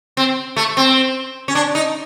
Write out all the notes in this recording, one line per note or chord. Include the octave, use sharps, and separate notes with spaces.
C4
A3
C4
C#4
D4
D#4